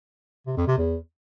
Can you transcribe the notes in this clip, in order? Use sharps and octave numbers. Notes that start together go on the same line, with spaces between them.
C3
F2
C3
E2